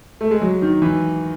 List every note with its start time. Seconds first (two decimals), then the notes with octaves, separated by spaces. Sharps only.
0.21 A3
0.31 G#3
0.42 F#3
0.62 D#3
0.82 E3